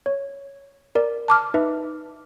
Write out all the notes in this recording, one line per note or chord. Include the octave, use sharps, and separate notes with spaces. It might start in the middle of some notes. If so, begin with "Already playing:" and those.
C#5
A#4 D5
A5 D6 F6
D#4 B4 E5